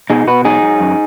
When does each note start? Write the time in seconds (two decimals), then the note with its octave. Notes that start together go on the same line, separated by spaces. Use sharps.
0.10 B2 D#4 G#4
0.27 B2 F#4 B4
0.45 F#3 D#4 G#4
0.63 F#3
0.80 F#2